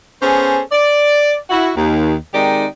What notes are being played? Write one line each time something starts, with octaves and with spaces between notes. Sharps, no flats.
B3 C#4 G#4 A4 C5
D5
E4 F#4
D#2
D#3 G#3 C4 D#4 G4 D5